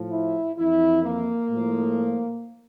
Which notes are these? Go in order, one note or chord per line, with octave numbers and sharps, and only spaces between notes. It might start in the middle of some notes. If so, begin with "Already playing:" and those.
Already playing: A2 F3
E4
F2 E3 E4
A#3
A2 F3